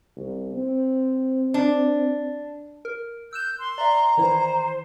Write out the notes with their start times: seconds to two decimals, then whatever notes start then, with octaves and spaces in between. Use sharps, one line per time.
0.16 C2
0.54 C4
1.54 D4
2.85 A#4
3.33 E6 F#6 G6 E7
3.59 C6
3.78 D5 E5 A#5
4.17 D#3 E3 E4 C5